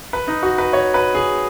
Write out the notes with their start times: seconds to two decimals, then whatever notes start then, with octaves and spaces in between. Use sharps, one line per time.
0.13 B4
0.28 D#4
0.43 F#4
0.58 B4
0.73 C#5
0.94 B4
1.15 G#4